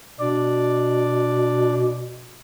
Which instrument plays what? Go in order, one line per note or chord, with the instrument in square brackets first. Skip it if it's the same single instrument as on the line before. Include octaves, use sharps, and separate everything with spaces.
[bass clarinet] B2 [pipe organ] D4 D5